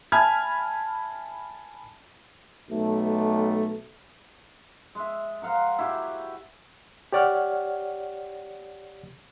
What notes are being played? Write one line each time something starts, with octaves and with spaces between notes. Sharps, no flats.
E5 G#5 A5 B5 F6 G#6
B1 A3
G#3 E5
C5 F5 F#5 A#5
E4 F#4 G4
G4 C#5 D5 F#5 F6